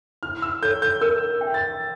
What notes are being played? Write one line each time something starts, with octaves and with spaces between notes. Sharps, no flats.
E4 F6
E6
A4 C#5 G6
G6
A#4 E6
E5 G5
A6